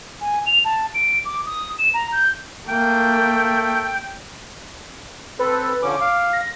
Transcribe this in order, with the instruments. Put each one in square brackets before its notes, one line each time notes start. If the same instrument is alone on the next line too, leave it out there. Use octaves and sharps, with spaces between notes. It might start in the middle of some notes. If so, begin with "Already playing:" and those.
[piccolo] G#5
F7
A5
D7
D6
D#6
E7
A#5
G6
[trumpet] A3 [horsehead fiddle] A#3 [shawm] G5
[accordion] C4 A4 [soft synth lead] B4
[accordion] D3 F3 C#4 [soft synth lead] D6
[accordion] F5
[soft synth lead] A#6